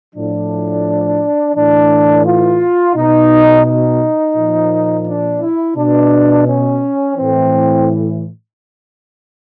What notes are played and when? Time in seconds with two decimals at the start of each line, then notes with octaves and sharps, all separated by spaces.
0.14 A2 F3 D4
1.55 A2 E3 D4
2.24 F4
2.95 B2 D#4
3.66 D#4
4.35 A#2 F3
5.06 D4
5.41 E4
5.76 B2 D4
6.46 C#4
7.16 A2 E3 C4